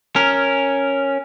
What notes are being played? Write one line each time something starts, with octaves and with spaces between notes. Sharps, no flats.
C#4 A#4